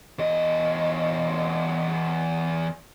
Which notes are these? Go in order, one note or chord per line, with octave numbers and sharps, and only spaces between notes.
E2 D#5